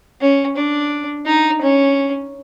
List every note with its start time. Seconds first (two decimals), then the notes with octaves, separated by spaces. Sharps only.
0.20 C#4
0.56 D4
1.26 D#4
1.61 C#4